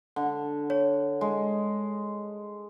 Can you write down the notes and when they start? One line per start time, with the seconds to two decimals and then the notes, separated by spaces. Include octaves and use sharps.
0.16 D3
0.70 C#5
1.21 G#3